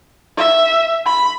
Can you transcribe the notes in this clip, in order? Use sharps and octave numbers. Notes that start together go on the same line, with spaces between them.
E5
B5